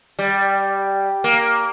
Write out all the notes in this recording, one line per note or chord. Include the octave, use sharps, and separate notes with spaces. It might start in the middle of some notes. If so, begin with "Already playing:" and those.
G3
A#3